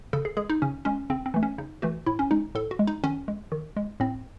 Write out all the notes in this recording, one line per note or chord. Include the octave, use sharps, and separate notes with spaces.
C#3 A4
G#4
G#3 G#4
D#4
C#3 C#4
G#3 C#4
C#3 C4
C4
E3 A3
C#4
C#3 D#4
E3 A3 F#4
A2 E4
C#4
G#3 D#4
A2 A4
F#4
G#3
D#4
D#3 C#4
G#3
D#3
G#3
A2 C4